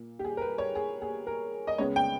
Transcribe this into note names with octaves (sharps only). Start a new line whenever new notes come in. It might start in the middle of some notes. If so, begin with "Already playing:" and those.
Already playing: A#2 A#3
G4
G#4
A#4
B4
C#5
G#4
G#4
A#4
D#5
C#2 C#3 G#3 B3 C#5
G5